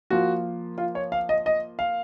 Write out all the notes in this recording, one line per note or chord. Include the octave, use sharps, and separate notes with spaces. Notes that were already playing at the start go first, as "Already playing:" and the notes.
F3 A#3 F4 F#4
F4
C#5
F5
D#5
D#5
F5